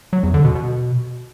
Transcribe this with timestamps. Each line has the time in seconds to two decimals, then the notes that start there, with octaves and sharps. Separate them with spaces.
0.13 F#3
0.23 E2
0.34 D3
0.45 B2
0.55 B2